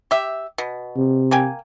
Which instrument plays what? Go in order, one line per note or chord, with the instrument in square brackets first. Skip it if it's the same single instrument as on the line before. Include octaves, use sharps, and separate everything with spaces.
[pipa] G4 E5
B2
[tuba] C3
[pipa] A#3 G5 G#5